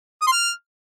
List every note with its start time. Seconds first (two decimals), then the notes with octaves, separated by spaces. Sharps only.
0.22 D#6
0.27 C6
0.32 F6